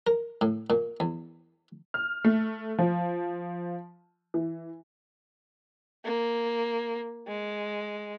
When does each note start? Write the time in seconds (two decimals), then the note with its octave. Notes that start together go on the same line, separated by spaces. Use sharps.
0.07 A#4
0.41 A2
0.70 A#2
1.00 E2
1.94 F6
2.24 A3
2.78 F3
4.34 E3
6.05 A#3
7.28 G#3